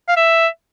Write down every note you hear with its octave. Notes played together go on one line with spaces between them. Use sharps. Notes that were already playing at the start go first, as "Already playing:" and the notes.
F5
E5